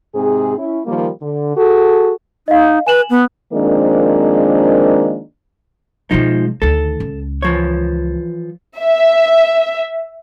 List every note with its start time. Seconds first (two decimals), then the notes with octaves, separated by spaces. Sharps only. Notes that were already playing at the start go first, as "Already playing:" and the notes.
0.15 G#2 C3 C4 G#4
0.58 C#4 E4
0.86 D#3 F3 G3 A#3
1.23 D3
1.57 F#4 G#4 A4
2.48 D#4 D#5 F5
2.87 B4 G#5 E7 F#7
3.10 B3
3.54 D#3 F3 G#3 A#3 C4 D4
6.11 B2 F3 G#3 D#4
6.62 D2 D#3 A4
7.00 C#2
7.42 E3 F3 C#5
8.79 E5